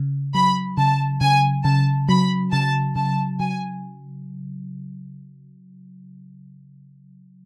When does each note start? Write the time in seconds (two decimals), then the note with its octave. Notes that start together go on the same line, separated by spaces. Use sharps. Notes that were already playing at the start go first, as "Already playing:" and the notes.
Already playing: C#3
0.34 F#3 B5
0.77 C#3 A5
1.21 C#3 G#5
1.64 C#3 A5
2.09 F#3 B5
2.52 C#3 A5
2.96 C#3 A5
3.40 F#3 G#5